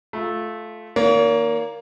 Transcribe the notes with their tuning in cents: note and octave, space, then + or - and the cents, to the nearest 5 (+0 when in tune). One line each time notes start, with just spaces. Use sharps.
A3 -15 F4 +0
D#3 +10 A#3 +5 C#5 +45